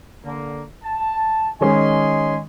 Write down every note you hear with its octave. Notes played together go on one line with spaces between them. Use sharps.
D3 A#3
A5
D#3 G#3 C#4 D#5 G#5 C6